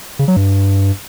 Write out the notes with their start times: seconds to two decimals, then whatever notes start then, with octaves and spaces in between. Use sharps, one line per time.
0.19 C#3
0.28 F#3
0.36 G2